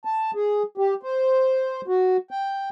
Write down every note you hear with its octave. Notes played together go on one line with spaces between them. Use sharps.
A5
G#4
G4
C5
F#4
G5